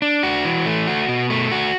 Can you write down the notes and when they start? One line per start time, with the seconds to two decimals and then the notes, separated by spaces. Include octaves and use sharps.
0.02 D4
0.23 F#4
0.45 E3
0.66 A3
0.87 F#4
1.08 B2
1.30 A3
1.52 F#4